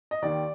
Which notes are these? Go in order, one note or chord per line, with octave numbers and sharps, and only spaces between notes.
D#5
D#2 D#3 D5